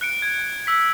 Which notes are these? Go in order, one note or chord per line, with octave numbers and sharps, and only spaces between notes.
F#6 C#7 D7
G#6 D7
E6 B6